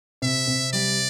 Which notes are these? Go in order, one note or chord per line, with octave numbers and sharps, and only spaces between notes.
C3 E5
C3
G3 D5